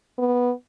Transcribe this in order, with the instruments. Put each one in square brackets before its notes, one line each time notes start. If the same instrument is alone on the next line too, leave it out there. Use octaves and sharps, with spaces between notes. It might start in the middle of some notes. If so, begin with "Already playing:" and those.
[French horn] B3